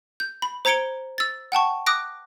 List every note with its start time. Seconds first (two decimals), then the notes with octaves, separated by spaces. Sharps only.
0.20 G6
0.42 B5
0.65 C5 A#5 G#6 C#7 D7 G7
1.18 E6 A6
1.52 F#5 G5 A5 C#6
1.86 D6 D#6 F#6 A#6 D7